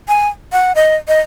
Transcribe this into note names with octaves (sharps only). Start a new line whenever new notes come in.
G#5
F#5
D#5
D#5